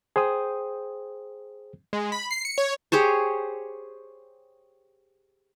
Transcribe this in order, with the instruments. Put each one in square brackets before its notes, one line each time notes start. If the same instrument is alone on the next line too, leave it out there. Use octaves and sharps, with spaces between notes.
[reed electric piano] G#4 C5 G5 D#6
[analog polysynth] G#3
B5
C7
C#7
C#5
[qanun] G4 G#4 C5 C#5